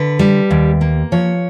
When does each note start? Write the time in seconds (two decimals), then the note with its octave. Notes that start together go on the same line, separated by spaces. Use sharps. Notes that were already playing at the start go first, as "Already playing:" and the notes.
Already playing: D3 B4
0.19 G3
0.51 D#2
0.81 A#3
1.12 F3 C#5